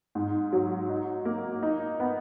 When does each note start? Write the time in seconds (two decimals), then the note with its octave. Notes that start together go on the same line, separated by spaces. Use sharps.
0.15 G#2
0.53 F#3
0.89 D#4
1.25 A#3
1.63 D#4
2.00 B3